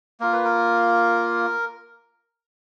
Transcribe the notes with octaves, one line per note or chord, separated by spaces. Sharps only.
A#3 F4 A#4
B4
A#4